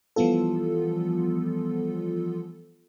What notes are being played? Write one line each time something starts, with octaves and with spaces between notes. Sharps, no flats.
E3 F3 G3 B3 F4 A4